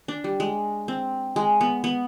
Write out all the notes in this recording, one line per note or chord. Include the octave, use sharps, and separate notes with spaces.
D4
G3
G#3
C4
G#3
B3
B3